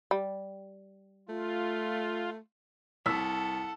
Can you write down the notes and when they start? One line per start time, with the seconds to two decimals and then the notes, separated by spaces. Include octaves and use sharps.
0.11 G3
1.29 A3 F4
3.06 C2 A4 F#5 E6 B6